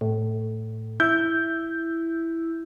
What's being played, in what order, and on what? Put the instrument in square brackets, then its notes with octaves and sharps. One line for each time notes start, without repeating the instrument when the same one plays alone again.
[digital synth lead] A2
[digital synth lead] E4 [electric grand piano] G6